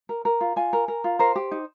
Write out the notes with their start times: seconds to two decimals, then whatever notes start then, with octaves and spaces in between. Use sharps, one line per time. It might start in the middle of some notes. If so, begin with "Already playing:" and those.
0.09 A#4
0.25 A#4
0.41 F4
0.56 F4 G#5
0.73 A#4
0.88 A#4
1.04 F4
1.19 A#4 C5
1.36 G4
1.51 D#4